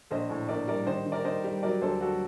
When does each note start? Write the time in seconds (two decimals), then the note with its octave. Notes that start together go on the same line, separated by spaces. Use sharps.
0.11 A#1 C5 D#5
0.30 A2
0.49 A#1 A#4 D5
0.68 G3 A#4 D5
0.87 D#3 C5 D#5
1.06 D#3
1.12 A#4 D5
1.25 D#3 C5 D#5
1.44 G3
1.63 F#3 A#4 D5
1.82 D2 A4 C5
2.01 F#3 F#4 A4